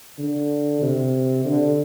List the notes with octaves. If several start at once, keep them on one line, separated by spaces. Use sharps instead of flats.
D3
C3
D3